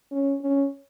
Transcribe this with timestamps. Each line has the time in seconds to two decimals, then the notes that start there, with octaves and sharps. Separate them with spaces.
0.12 C#4
0.42 C#4